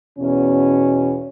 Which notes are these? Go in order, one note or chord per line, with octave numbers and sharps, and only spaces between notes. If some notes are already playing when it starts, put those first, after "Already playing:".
E2 B2 C#4